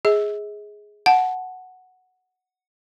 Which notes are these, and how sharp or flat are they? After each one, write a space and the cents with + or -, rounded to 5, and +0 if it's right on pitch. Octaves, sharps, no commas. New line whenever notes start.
G#4 +0 D#5 +45
F#5 +0 A5 -20